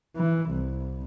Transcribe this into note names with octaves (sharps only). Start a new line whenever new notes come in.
E3
C2